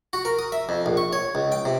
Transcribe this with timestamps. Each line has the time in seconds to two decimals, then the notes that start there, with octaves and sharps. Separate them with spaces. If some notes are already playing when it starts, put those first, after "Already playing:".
0.13 F#4
0.25 A#4
0.39 D#6
0.52 E5
0.69 F2
0.86 A#1
0.97 C#6
1.13 C#5
1.35 C#2
1.52 G5
1.65 C3